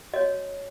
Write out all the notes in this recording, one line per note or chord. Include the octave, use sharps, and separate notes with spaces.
F#4 C#5 D#5